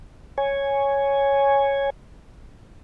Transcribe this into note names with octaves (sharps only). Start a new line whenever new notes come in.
C#5 G#5